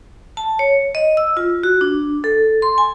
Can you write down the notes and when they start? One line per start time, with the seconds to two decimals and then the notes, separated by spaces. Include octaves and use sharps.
0.37 A5
0.59 C#5
0.95 D#5
1.17 E6
1.37 F4
1.63 F#4
1.81 D4
2.24 A4
2.62 C6
2.78 G#5